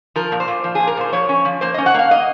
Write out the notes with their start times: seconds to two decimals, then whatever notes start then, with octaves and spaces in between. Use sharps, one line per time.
0.16 F3 A#4
0.32 A#2
0.40 C5
0.48 A#2
0.64 F3
0.75 A#2 G#4
0.87 A#4
0.97 A#2 C5
1.13 F3 C#5
1.29 C#4
1.45 F3
1.61 A#3 C5
1.74 D#5
1.78 C#4
1.86 F#5
1.94 A#3 F5
2.11 D#5